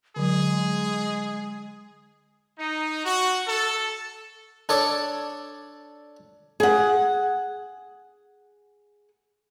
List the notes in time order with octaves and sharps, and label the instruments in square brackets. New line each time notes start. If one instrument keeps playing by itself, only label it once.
[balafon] D3 F#3 [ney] G#3 [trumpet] G#4
[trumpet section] D#4
F#4
A4
[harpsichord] D4 A4 C#5 D5 D6
[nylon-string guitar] G#4 F#5